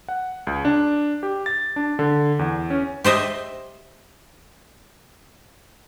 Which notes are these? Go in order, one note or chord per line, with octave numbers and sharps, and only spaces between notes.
F#5
C#2
D4
G4
A6
D4
D3
E2
C#4
G4 C5 D#5 E5